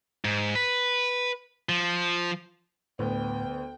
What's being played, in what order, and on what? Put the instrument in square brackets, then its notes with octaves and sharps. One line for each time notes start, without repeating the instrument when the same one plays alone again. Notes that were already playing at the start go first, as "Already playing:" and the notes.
[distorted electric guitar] G#2
B4
F3
[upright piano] D2 B3 [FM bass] A2 [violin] G5